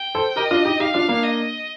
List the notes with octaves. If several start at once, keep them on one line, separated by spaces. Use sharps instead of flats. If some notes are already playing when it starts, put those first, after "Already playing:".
Already playing: G5
A4 C5
G4 A#4 D#5
D4 F4
D#4 G4
D#4 G4 F5
D4 F4
A#3 D4
D#5